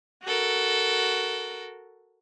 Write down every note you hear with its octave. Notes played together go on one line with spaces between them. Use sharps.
F#4 A4 A#4